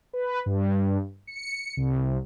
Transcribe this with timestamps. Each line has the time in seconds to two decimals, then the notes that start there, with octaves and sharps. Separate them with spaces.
0.13 B4
0.46 G2
1.27 C#7
1.77 C2